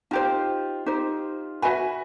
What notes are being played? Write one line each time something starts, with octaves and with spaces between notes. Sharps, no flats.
D#4 F4 G4 C5
D#4 G4 C5
F#4 B4 E5 G#5 B5